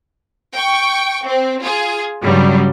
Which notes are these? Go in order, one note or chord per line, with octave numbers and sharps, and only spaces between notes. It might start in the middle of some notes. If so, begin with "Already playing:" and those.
G5 C#6
C4
F4 G#4
G2 C#3 F#3 G3